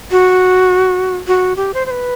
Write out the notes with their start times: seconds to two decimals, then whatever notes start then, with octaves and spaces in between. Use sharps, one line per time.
0.11 F#4
1.27 F#4
1.57 G4
1.74 C5
1.86 C5
1.91 B4